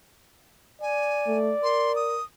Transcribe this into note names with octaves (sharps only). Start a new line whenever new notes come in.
D5 G#5
A3
A#4 C6
D#6